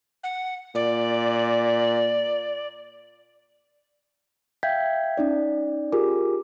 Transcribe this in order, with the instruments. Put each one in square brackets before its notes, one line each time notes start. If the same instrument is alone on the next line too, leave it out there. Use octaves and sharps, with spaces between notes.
[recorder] F#5
[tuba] A#2 [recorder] D5
[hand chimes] E5 F5 G5 G6 G#6 B6
C#4 D#4 D5
F4 G4 G#4 A#4 G#5 D6